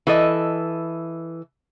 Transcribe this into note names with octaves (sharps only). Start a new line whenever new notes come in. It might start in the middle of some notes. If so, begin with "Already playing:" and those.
E3 A4 D#5